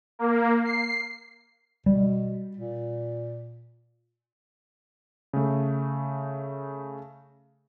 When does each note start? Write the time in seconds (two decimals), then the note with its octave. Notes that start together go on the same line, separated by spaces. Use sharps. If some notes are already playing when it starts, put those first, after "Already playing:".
0.19 A#3
0.65 C7
1.86 B2 G3
2.57 A#2
5.33 C#3 A3